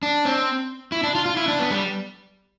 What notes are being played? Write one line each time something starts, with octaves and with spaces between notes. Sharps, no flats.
D4
C4
E4
D4
F4
F4
E4
D4
B3
G3